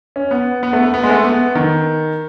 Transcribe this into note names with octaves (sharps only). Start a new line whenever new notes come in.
C#4
B3
B3
A3
B3
B3
G#3
A3
B3
D#3